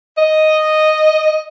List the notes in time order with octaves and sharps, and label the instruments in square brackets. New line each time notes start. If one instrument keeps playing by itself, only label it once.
[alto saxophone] D#5